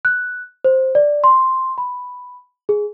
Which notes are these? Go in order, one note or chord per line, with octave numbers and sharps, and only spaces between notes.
F#6
C5
D5
C6
B5
G#4